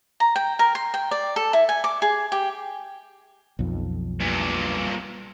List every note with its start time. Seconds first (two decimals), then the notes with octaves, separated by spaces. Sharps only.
0.20 A#5
0.36 G5
0.59 A#4
0.75 C6
0.94 G5
1.11 D5
1.36 A4
1.53 E4
1.69 G#5
1.84 D6
2.02 G#4
2.32 G4
3.59 B1 F2
4.20 G2 A#2